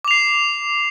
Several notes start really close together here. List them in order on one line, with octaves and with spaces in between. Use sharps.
D6 F7 C7